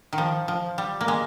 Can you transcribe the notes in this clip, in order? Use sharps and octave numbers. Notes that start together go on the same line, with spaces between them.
D#3
F3
F3
G3
A#3
G#3